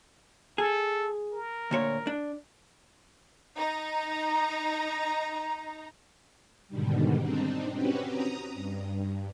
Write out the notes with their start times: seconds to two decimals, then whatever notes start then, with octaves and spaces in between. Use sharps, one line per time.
0.58 G#4 A4
1.32 A#4
1.71 D2 A#2 C#5
2.07 D4
3.57 D#4 A#5
6.68 G#2 B2 D3 D#3 G3
7.19 C4 D4 D#4
7.74 C4 C#4 F#4 G4 B4
8.07 A#5 D#6
8.54 G2